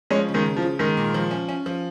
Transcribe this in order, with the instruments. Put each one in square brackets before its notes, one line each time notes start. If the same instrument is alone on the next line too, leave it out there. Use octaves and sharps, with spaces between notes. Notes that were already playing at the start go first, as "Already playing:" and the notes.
[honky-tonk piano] F3 [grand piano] G#3 C#4
[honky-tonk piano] C#3
[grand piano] D#3 G#3
[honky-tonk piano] C#3
[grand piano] F3
[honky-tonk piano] C#3
[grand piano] D#3 G#3 [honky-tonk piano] A#4
[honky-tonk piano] A#2
F3
C#4
C#4
F3